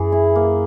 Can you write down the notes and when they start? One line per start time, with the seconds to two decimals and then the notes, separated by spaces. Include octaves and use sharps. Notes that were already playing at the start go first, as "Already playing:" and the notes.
Already playing: F#2 E3 G#4
0.12 E4
0.36 A#3